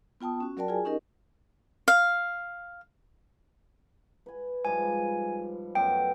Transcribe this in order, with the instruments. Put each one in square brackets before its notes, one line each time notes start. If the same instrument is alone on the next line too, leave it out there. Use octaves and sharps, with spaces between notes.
[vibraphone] B3 F4 G5 A5 D#6
C#4 F#4
F#3 F#4 A#4 D5 G5 A5
F4 G#4 G#5
C#4 D#4 G4 A#4 D#5
[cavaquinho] F5
[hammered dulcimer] B4 G#5
[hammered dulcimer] G#2 F3 G3 [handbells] G#5
[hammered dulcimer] F#2 B2 A3 [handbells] G5